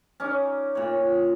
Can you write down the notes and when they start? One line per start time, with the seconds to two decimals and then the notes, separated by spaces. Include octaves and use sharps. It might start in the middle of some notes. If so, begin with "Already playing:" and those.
0.20 C#4 D#4 D5
0.75 A#2 C#5